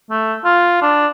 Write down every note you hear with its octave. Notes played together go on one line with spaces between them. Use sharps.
A3
F4
D4